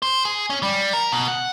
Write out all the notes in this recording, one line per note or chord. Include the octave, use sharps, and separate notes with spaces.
C5
G#4
C#4
G3
A#4
B2
F#5